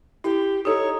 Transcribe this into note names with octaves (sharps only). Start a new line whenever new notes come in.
E4 G4
D#4 G4 A4 C#5